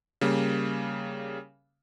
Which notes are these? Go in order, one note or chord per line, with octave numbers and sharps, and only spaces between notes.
C#3 G3 A#3